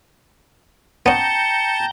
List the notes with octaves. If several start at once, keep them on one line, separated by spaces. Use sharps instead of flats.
B3 C#4 G5 A5 A#5 G6 C#7